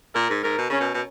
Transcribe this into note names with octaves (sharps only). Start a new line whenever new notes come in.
A#2 A#4
G#2
G#2 A#4
B2
C#3 C#4
B2
B2